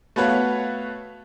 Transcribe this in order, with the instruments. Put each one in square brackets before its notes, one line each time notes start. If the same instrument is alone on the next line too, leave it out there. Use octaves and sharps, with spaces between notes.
[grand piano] A3 B3 F#4 B4 C#5 F5